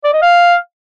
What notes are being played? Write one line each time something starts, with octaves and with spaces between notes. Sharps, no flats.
D5
D#5
F5